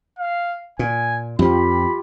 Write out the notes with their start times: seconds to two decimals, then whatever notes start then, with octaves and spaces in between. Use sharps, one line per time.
0.19 F5
0.79 A#2 G#5
1.39 F2 F3 F4 G4 B5